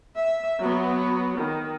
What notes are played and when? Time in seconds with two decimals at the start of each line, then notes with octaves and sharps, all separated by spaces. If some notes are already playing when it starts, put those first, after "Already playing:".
0.16 E5
0.59 F#3 B3
1.38 D#3